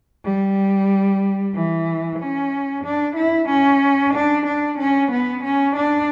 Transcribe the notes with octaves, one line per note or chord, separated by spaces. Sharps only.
G3
E3
C#4
D4
E4
C#4
D4
D4
C#4
B3
C#4
D4